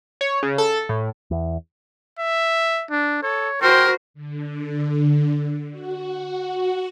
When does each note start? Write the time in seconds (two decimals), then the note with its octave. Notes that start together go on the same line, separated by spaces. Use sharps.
0.21 C#5
0.43 C#3
0.58 A4
0.89 A2
1.31 E2
2.19 E5
2.91 D4
3.23 A4 C#5
3.62 F#4 A#4 C5 G5 C6
4.14 D3
5.71 F#4